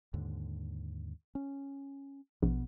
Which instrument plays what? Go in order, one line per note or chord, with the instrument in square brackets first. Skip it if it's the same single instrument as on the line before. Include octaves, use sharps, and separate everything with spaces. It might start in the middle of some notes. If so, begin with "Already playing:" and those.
[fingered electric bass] D#2 G#2 D3
C#4
[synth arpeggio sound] A#1 [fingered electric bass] B2 B3